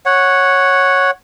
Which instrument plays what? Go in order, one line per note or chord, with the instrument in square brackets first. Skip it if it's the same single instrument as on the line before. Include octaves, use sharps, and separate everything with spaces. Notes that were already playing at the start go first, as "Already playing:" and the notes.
[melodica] C#5 F#5